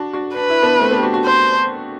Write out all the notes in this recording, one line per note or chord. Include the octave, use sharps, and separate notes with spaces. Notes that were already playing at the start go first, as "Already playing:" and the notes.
Already playing: D4 F#4
D4 F#4
D4 B4
E4
B3 D4
D4
A3 C4
B3 D4
G4
D4 F#4
D4 F#4
C5